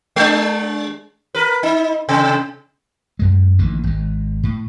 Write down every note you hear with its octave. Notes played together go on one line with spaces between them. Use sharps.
G#3 D4
A#4 B4
D#4
C3
F#2 G#3
A1 D3 D#3 A#3
G#1 G#3
A2